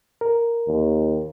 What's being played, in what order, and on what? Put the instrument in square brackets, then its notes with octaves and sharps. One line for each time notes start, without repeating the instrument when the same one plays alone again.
[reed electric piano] A#4
[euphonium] D#2